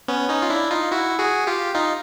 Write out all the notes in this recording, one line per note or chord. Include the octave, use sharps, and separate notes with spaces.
B3 C#4
C#4 D#4
F4
D4 E4
D#4 F4
E4 F#4
F#4 G#4
F4 G4
D#4 F4